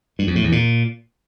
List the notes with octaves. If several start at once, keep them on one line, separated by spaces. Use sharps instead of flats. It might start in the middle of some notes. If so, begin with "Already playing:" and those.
G2
F2
A2
E2
A#2